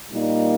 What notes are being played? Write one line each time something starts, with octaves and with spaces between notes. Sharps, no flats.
A#2 G3 A#3 D#4